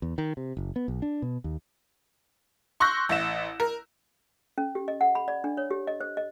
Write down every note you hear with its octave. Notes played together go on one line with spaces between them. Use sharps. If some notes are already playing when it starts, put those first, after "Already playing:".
E2
D#3
C3
F#1
B3
B1
D4
B2
D#2
C6 C#6 E6 F#6 G6 A#6
A1 E5 E7
A#4
C#4
G4
D#5
F#5
B5
D5
D4
C#5
G4
D#5
C5
D#5